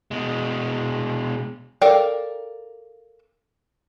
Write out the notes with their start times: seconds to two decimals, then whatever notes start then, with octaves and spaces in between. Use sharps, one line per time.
0.11 B2 G#3
1.81 A4 A#4 D5 F5 G5